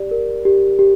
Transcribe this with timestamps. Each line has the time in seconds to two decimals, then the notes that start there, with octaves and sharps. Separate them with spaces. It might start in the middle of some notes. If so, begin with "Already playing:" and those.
Already playing: G4 D5
0.11 A#4
0.45 G4
0.79 G4